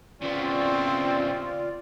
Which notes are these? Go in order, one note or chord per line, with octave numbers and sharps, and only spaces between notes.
C#3 B3 C4 F4 D5